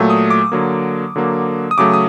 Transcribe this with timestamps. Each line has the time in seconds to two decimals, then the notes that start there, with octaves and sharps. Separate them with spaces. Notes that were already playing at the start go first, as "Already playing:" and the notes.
Already playing: A#2 F#3 A3
0.10 D#6
0.31 D6
0.52 D3 F#3 A#3
1.16 D3 F#3 A#3
1.71 D#6
1.78 C#3 F#3 A3 D6
1.93 D#6